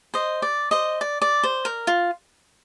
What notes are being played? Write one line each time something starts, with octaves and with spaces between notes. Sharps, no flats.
C5 D#5
D5
C5 D#5
D5
D5
C5
A#4
F4